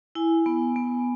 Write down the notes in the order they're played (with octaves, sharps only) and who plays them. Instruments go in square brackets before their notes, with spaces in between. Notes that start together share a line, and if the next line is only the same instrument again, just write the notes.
[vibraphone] E4 G#5
B3
B3